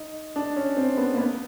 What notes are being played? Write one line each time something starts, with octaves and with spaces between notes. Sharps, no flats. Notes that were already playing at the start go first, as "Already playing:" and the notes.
Already playing: D#4
D4
C#4
C4
B3
A#3
B3